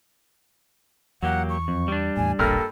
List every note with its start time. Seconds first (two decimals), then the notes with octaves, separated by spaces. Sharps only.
1.23 E2 F#3 A#3 G4 F#5
1.50 C#6
1.68 F2
1.88 G3 D4
2.17 E2 A2 G#5
2.39 E1 A#1 G2 A#3 A4 F6